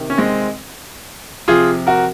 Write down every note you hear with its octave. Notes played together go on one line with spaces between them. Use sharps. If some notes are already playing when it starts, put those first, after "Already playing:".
Already playing: C3 D#3
C#4
G#3 C4
C3 F3 F4 G#4
F#4 A#4